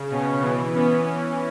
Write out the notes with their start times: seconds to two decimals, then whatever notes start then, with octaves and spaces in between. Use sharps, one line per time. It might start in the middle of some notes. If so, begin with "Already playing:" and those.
Already playing: C#3
0.11 B2 C#4
0.43 E3 B3
0.75 B3 C#4